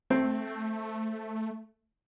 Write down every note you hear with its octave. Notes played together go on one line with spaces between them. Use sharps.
A3 C4